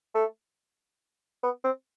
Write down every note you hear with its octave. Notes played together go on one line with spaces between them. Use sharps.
A3
B3
C4